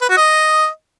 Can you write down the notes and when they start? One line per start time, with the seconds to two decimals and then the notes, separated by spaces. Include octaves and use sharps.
0.01 B4
0.09 F#4
0.17 D#5